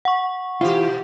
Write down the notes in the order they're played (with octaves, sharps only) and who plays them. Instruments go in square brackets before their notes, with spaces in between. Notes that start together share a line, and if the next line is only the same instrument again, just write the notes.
[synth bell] F#5 C#6
[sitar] B2 G4 [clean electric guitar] E3 F4